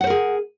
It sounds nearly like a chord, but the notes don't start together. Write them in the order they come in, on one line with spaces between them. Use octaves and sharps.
F#5 C5 A#4 G#4